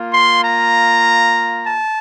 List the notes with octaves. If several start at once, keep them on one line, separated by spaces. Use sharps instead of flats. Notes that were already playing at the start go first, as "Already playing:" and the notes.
Already playing: A#3 F4
C6
A#5
A5